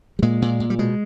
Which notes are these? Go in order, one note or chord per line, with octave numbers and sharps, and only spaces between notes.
G3
A#2 G#3
A#2
A#2
G3
B2 G#3